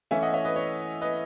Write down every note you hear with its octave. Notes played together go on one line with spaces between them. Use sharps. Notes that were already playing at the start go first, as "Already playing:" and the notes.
E3 A3 C#4 E4 E5 G#5
D#5 F#5
C#5 E5
B4 D#5
C#5
B4 D#5